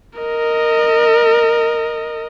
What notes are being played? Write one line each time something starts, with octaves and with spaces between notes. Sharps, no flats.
A#4 D#5